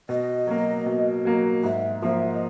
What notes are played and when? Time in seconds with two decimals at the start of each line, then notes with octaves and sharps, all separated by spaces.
0.09 B2 D#5
0.47 F#3 A#3
0.86 B2
1.25 F#3 A#3
1.63 G#2 E5
2.02 F3 A#3 E5
2.33 D#5